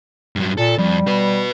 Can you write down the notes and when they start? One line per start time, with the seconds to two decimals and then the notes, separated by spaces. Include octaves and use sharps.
0.36 G2 F#3
0.57 A#2 A4
0.78 F2 G3
1.07 F#4 B4